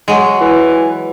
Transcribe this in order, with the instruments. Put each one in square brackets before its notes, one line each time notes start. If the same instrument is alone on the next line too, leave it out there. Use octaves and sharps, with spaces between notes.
[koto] F#3 G#3
[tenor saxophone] E3